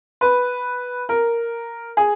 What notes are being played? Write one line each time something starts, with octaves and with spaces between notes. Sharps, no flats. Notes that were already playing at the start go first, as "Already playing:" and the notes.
B4
A#4
G#4